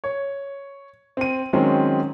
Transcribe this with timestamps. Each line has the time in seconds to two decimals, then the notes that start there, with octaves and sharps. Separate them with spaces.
0.04 C#5
1.17 C4 D#7
1.53 D#3 F#3 G#3 C4 C#4